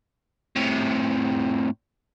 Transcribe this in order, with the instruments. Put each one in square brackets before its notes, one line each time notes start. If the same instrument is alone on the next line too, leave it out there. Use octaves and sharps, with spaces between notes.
[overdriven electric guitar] A2 C3